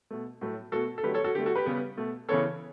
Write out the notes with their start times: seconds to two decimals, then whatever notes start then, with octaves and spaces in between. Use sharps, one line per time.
0.11 B2 A3
0.41 A2 F#3 A3
0.72 B2 A3 F#4 A4
0.98 A4
1.03 D3 F#3 A3 G4 B4
1.14 A4 C#5
1.24 F#4 A4
1.35 D3 A3 G4
1.46 F#4 A4
1.55 G4 B4
1.66 C#3 G3 B3
1.97 B2 A3
2.29 C#3 E3 B3 A4 C#5